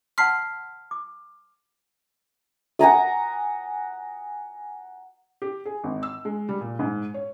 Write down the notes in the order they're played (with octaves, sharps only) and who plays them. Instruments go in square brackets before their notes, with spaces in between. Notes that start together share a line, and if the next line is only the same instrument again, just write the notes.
[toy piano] F#5 A5 C6 [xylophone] F6 B6 C7
[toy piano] D6
[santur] F#5 G#5 A#5 D#6
[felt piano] G4
G#4
G#1
E6
G#3
G3
A#2
G#2
C#5